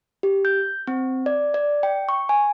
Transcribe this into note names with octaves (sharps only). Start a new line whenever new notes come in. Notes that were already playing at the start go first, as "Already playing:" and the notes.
G4
G6
C4
D5
D5
G5
C#6
G#5